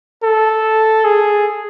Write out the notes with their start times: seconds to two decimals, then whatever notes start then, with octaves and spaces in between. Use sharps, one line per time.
0.23 A4
1.05 G#4